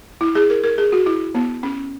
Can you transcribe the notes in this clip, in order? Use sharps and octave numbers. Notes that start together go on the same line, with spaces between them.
E4
G#4
A#4
A#4
G#4
F#4
E4
B3
C#4